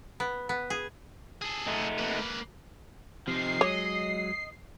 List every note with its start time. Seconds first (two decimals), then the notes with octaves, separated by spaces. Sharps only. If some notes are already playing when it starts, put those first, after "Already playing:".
0.20 B3
0.49 B3
0.70 G#4
1.42 G#4 A4
1.67 A3 D#4
1.98 A#3 B4
3.28 C3 F3 D#4 C7
3.61 F#3 G#3 C#5 D#5